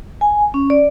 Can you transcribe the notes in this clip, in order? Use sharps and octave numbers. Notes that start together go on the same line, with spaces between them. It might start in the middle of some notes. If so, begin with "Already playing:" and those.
G#5
C#4
D5